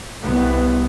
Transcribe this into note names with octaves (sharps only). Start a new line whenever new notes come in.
C2 B3